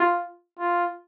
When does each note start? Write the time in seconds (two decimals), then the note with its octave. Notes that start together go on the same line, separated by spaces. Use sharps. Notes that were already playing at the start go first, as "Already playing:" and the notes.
Already playing: F4
0.59 F4